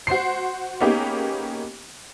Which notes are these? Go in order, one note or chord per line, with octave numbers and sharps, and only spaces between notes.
F#4 C5 C6 C7
A#3 B3 C#4 D#4 G4 G#4